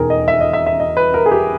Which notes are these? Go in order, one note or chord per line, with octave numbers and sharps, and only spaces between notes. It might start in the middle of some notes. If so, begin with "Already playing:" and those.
Already playing: E1 D#2 D#3 G#4 A#4
D#5
E5
D#5
E5
E5
D#5
B4
A#4
G#4
G4